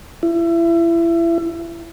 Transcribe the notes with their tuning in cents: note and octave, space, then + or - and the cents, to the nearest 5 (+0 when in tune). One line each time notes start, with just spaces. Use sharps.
E4 +30